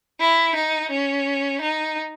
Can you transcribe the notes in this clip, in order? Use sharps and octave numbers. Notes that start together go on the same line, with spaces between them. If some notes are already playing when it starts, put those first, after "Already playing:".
E4
D#4
C#4
D#4